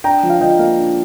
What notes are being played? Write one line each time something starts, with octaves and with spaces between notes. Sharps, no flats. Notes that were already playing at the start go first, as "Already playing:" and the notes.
D4 G5 A#5
F3
F5
F3 D#5 G5
A#3 F5
D4